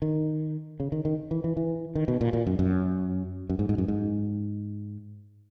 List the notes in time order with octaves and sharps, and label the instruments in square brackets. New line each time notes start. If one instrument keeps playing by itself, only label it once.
[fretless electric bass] D#3
C#3
D#3
D#3
E3
E3
E3
D#3
B2
A#2
A#2
F#2
F#2
F#2
G#2
G#2
F#2
G#2